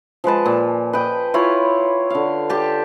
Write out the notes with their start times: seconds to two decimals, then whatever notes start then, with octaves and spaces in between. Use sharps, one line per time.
0.24 F3 G#3 B4 A5
0.46 A#2
0.93 B4 D#5 G5
1.34 E4 F4 C#5 B5
2.10 D3 F5
2.50 G4 A5